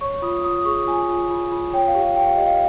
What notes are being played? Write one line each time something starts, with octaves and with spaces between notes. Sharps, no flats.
C#5 C#6
F4 D#6
F4 D#6
G#4 C#6
F4 G#5
F4
F4
F4
C#5 G5
F5
G4
G5
G4 G5
F5
G4 D#5
F5